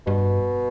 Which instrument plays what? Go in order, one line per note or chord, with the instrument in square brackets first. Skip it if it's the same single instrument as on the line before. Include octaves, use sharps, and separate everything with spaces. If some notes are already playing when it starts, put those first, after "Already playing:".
[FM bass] G2 [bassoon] B2